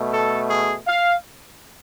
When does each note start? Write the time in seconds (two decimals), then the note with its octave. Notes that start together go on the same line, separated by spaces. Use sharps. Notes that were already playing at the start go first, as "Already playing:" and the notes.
Already playing: B2 A3
0.13 A4
0.50 G#4
0.87 F5